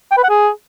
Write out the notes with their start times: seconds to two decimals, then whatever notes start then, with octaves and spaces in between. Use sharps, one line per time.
0.11 G5
0.17 B4
0.23 F#5
0.29 G#4